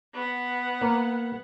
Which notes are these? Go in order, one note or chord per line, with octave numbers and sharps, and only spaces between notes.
B3 F#5
A#3